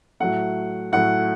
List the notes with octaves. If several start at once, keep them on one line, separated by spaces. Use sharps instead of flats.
A2 F#3 A3 F#5
A2 F#3 A3 F#5